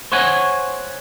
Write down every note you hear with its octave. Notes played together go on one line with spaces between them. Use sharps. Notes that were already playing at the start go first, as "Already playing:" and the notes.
C5 C#5 F#5 G#5